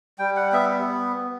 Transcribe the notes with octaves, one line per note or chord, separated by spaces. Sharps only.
G3 G5
F#5
B3 E5